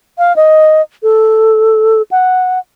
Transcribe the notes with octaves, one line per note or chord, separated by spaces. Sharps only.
F5
D#5
A4
F#5